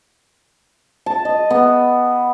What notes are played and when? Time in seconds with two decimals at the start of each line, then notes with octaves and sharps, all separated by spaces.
1.06 A5
1.25 D#5
1.50 B3